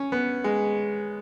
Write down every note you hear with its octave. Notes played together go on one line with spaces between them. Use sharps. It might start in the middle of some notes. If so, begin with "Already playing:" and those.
Already playing: C#4
B3
G#3